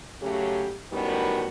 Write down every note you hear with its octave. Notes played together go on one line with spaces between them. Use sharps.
C#3 F#3 A3 G4
F#2 A2 D#3 G3 B3 F#4